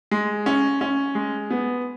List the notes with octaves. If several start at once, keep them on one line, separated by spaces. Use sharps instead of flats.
G#3
C#4
C#4
G#3
B3